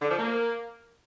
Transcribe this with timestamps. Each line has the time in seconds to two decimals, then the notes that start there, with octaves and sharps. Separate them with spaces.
0.02 D3
0.10 F3
0.18 A#3